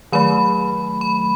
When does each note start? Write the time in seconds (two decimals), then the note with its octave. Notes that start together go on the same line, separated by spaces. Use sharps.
0.12 D#3 F#3 A3 B5
1.01 B5